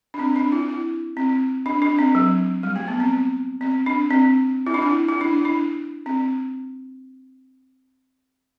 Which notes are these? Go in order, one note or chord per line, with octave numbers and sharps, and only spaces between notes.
D4
C4
D4
E4
E4
C4
D4
D4
C4
F#3
G3
A3
B3
C4
C4
D4
C4
E4
D4
E4
E4
D4
E4
D4
C4